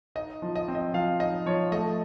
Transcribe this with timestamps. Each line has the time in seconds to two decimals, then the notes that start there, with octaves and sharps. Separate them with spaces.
0.15 D#4 D#5
0.42 F3
0.56 D#5
0.68 C4
0.75 D#5
0.93 F3 F5
1.20 D#4 D#5
1.46 F3 C#5
1.72 A3 D#5